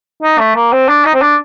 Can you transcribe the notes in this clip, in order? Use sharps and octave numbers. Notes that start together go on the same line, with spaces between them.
D#4
A3
A#3
C4
D4
D#4
C4
D4